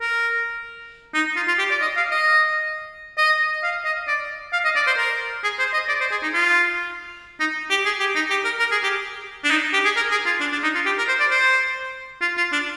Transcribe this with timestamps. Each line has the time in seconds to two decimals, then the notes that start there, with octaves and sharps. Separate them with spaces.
0.01 A#4
1.14 D#4
1.36 F4
1.48 F4
1.58 G4
1.71 D5
1.81 D#5
1.97 F5
2.11 D#5
3.18 D#5
3.63 F5
3.84 D#5
4.07 D5
4.53 F5
4.65 D#5
4.76 D5
4.87 C5
4.97 A#4
5.43 G#4
5.59 C5
5.73 D#5
5.89 D5
6.00 C5
6.11 G#4
6.23 D#4
6.34 F4
7.40 D#4
7.70 G4
7.85 G#4
8.00 G4
8.15 D#4
8.30 G4
8.44 A#4
8.59 A#4
8.71 G#4
8.83 G4
9.44 D4
9.50 D#4
9.73 G4
9.85 G#4
9.96 A#4
10.11 G#4
10.26 F4
10.41 D4
10.52 D4
10.63 D#4
10.75 F4
10.86 G4
10.98 A#4
11.08 C5
11.20 D5
11.31 C5
12.21 F4
12.37 F4
12.52 D4